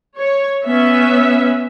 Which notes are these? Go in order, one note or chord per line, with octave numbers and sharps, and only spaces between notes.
C#5
B3 C#4 E5